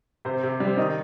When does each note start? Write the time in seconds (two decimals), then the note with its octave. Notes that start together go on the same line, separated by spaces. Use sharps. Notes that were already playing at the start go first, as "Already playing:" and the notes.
0.25 C3 C5
0.43 C3
0.60 G3
0.67 C5
0.77 D#3 D#5